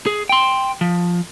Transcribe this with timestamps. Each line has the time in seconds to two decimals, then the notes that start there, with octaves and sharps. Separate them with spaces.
0.07 G#4
0.29 G5 C6
0.81 F3